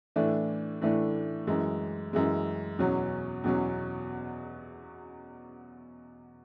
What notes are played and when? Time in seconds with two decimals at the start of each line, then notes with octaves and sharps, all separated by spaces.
0.16 A2 E3 A3 D4
0.82 A2 E3 A3 D4
1.47 F#2 E3 G#3
2.13 F#2 E3 G#3
2.79 E2 B2 F#3 C#4
3.44 E2 B2 F#3 C#4